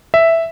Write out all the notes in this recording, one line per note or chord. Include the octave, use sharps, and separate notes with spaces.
E5